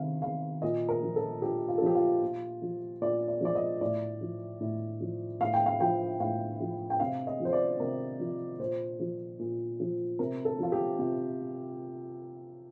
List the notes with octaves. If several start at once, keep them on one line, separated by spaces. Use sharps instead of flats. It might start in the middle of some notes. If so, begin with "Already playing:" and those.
Already playing: C3 D#3 F5
D#3 F5
A#2 D#5
A#4
F3
A4
A#2 G4
F4
A4
F3 G4
F4
A#2
F3
A#2 D5
D5
F3 D5
D#5
A2 D5
F3
A2
F3
A2 F5
G5
F5
F3 G5
A2 F5
F3
G5
C3 F5
D#5
F3
C5
D5
C3 A#4
F3
A#2 C5
F3
A#2
F3
C3 A#4
A4
F3 F4
G4
C3 F4